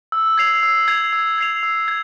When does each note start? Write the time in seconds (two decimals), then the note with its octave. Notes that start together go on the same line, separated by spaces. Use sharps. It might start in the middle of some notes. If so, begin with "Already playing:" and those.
0.12 E6
0.38 G#6 C7 F7
0.63 E6
0.88 G#6 C7 F7
1.13 E6
1.38 G#6 C7 F7
1.63 E6
1.88 G#6